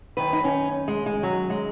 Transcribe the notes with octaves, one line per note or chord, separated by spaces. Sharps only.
F#2 D#3 B4
D#4
C#4
G#3
G#3
F#3
G#3